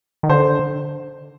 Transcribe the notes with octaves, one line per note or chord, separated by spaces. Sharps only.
D#3
D3 C5